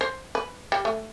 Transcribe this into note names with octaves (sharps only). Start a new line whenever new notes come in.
C5
B4
G3
A3